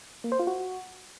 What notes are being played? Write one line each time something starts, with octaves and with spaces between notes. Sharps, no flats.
A#3
C5
F4
F#4